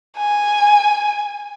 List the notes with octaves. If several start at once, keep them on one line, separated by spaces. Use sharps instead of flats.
G#5